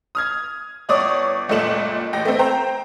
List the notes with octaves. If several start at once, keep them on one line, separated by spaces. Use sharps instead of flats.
D#6 F6 G#6
G1 C#5 D5 C#6 D#6
F#1 C#2 A#2 A3 E7 F#7
A1 G5 A#6
A3 C4
C5 G5 A#5